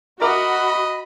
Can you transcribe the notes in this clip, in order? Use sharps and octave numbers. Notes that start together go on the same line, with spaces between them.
F#4 A#4 D#5 E5 B5 D6